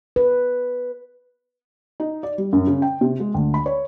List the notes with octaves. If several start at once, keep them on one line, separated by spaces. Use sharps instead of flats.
B4
D#4
D5
G3
F#2
C#3
G5
C3
G#3
D2
B5
C#5